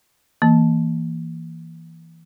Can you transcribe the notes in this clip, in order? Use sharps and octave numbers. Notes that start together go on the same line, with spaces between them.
E3 A#3